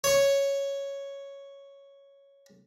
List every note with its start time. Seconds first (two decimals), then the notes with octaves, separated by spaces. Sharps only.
0.04 C#5 C#6